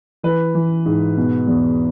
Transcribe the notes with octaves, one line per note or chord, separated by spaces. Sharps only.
E3 B4
E3
G#2
B2
E2